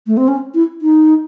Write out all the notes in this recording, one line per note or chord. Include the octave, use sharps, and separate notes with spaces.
A3
C4
C#4
E4
D#4